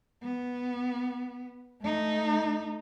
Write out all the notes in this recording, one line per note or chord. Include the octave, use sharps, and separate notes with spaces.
B3
A3 D#4